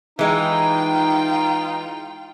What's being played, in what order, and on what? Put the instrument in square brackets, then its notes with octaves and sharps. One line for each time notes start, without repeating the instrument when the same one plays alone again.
[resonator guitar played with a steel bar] E3 G#3 [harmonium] D#4 [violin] F4 G5